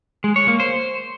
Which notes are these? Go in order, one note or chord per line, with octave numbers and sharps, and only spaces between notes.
G#3
C#5
A#3
C5